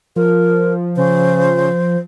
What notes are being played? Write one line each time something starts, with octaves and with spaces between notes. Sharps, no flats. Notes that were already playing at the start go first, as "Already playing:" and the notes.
F3 A#4
C#3 C5